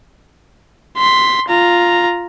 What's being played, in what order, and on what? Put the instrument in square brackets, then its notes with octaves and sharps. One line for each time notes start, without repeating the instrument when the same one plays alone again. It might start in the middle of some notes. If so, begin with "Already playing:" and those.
[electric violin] C6 B6
F4 A#5